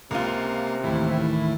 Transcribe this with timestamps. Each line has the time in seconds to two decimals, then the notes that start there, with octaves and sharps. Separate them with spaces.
0.11 C#2 C3 A#3 F4
0.84 D#2 A2 E3 E4